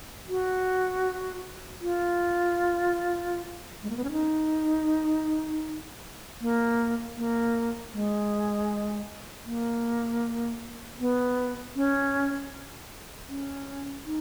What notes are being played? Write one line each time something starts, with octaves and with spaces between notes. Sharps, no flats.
F#4
F4
G#3
A#3
B3
C#4
D#4
A#3
A#3
G#3
A#3
B3
C#4
C#4
D#4